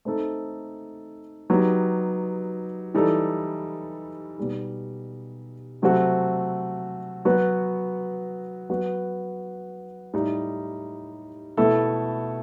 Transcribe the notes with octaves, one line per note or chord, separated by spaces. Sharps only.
A3 C4 D#4 A4
F#3 B3 D#4 G4
E3 G3 D#4 A4
B2 G3 D#4
C3 F#3 A3 C4 F#4
F#3 B3 F#4 B4
F#3 B3 F#4 B4
A2 G3 D#4
B2 A3 E4 A4